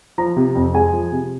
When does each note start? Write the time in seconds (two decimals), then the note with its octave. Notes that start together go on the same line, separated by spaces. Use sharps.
0.18 F3 A#5
0.36 C3
0.55 F2
0.74 G#3 G#5
0.93 F3
1.12 C3